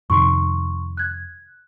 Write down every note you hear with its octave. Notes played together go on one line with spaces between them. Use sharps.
F2 C3 D#3 C6 C#6
F#6 G#6